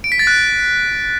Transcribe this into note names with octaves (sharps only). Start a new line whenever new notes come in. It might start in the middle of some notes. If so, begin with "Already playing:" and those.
D7
B6
A6
F#6